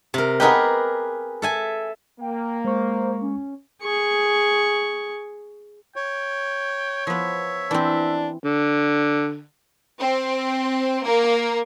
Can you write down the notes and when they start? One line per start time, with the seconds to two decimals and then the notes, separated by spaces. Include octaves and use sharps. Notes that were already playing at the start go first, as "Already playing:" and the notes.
0.14 C3 A#4
0.40 B3 D#4 G4 G#4 A#4 B4
1.42 A4 E5 G#5
2.20 A#3 G5
2.65 G#3 C5 C#6
3.21 C#4
3.82 G#4 C#6
5.96 C#5 G5
7.07 F3 B3 E5
7.71 E3 C4 D4
8.44 D3
9.99 C4
11.05 A#3